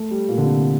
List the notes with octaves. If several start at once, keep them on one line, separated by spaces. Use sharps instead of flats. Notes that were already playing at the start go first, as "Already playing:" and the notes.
Already playing: A3
G3
A#2
D3
C3